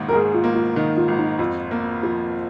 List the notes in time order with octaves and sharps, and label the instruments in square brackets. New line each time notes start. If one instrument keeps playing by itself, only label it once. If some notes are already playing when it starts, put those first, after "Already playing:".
Already playing: [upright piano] G#1 G#2 D#3 A#3
[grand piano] A#4
[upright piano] G#2 [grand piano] G#4
[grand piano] F4
[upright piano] A#3
[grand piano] F4
[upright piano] D#3 [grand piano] D#4
[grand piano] F4
[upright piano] G#1
[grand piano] D#4
[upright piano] F2 [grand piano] F4
[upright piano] A#3
F3